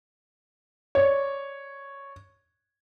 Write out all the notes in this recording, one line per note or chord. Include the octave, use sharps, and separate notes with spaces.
C#5 D5